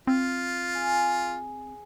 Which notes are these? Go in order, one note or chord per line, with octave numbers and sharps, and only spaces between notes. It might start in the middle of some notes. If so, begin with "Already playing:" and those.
C4 F4
G#4